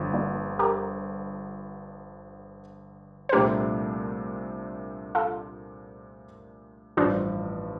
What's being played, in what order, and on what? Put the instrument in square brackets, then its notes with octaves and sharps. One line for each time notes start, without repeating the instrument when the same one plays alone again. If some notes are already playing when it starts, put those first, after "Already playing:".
Already playing: [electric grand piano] G1 G2 D3 F3
[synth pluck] A#3 D4
G4 A#4
C5
[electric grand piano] C2 A#2 F3 A3 D4 [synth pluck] G4 A#4
[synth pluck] F4 A4
[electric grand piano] A1 G2 F3 [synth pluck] D4 F4